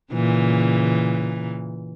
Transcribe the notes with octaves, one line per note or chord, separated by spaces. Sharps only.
A#2 C#3 E3